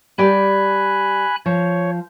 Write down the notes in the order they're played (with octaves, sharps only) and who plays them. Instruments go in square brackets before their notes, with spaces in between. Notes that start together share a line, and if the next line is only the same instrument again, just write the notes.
[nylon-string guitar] G3 G4 D5 [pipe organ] G#5 B5 F#6
[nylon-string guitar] F3 [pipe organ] C#5